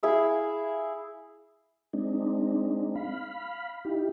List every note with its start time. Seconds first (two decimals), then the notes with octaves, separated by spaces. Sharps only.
0.03 E4 G#4 E5 F5
1.93 G#3 C4 D4 D#4
2.95 F5 B5
3.85 D#4 E4 G4